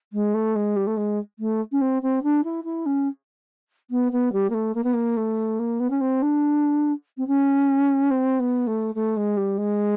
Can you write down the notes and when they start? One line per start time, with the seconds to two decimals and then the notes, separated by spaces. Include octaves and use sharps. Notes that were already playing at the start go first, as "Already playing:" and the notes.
0.13 G#3
0.34 A3
0.55 G#3
0.76 G3
0.87 A3
0.97 G#3
1.39 A3
1.72 C#4
1.81 C4
2.02 C4
2.23 D4
2.44 E4
2.64 E4
2.86 C#4
3.90 B3
4.12 B3
4.32 G3
4.50 A#3
4.54 A3
4.74 A#3
4.84 B3
4.93 A#3
5.17 A3
5.59 A#3
5.80 B3
5.90 C#4
6.00 C4
6.22 D4
7.17 C4
7.27 C#4
8.10 C4
8.39 B3
8.67 A3
8.95 A3
9.16 G#3
9.37 G3
9.58 G#3